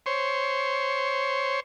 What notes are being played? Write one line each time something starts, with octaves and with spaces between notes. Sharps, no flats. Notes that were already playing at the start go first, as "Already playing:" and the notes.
C5 C#5